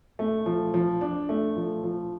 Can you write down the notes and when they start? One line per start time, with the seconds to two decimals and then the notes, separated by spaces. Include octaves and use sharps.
0.19 A3
0.46 F3
0.74 F3
1.01 D4
1.29 A3
1.56 F3
1.84 F3